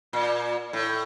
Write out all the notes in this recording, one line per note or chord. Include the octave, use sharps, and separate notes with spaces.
A#2
A2